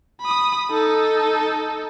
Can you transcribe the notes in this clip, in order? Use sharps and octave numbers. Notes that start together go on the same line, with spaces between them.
B5 D#6
D#4 A4